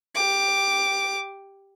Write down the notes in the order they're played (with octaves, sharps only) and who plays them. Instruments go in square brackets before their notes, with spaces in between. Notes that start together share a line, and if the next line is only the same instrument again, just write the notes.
[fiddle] G4 D6